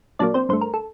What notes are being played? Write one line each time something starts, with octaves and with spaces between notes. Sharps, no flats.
A#2 F#3 A#3 D4 D5
C4 C5
G2 D3 A3 C5
A#4
A4